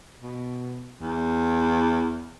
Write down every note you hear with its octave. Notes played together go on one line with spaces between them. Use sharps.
B2
E2